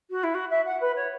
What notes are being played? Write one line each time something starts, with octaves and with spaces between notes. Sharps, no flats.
F#4
E4
F#4
E5
F#5
B4
C#5